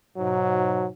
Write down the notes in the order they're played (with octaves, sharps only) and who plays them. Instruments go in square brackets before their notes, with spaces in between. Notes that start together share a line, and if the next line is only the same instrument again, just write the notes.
[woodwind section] G#2 B2 [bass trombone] F#3